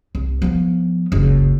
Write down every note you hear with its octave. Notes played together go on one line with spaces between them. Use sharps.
C2
F3 B3
F#1 C#2